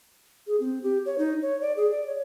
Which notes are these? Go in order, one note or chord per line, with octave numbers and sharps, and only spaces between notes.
G#4
C4
G4
C#5
D#4
C#5
D5
G#4
D5
C#5